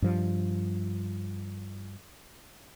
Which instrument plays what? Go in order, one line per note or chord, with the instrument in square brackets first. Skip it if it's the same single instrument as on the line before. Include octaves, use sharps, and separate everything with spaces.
[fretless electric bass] G2 F3